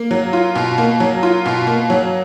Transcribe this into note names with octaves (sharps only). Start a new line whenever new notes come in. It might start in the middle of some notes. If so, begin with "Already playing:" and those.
Already playing: A#3
F#3
F4
B2
A#3
F#3
F4
B2
A#3
F#3